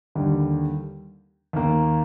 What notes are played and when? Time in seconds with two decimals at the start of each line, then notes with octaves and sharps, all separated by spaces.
0.15 D#2 D3 G3
1.53 D#2 D#3 A#3